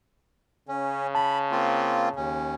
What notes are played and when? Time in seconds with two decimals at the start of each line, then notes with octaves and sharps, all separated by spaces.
0.68 C#3 C#4
1.15 A5 B5
1.52 A#3 C4 F4
2.16 D#2 C#4